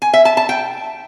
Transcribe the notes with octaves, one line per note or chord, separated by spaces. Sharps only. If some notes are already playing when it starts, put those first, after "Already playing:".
G#5
E5
A5
A5
G5